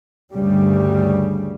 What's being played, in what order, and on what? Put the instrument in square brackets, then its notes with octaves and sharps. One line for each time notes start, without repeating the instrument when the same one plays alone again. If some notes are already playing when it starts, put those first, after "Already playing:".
[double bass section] D2 G2 C#3 G3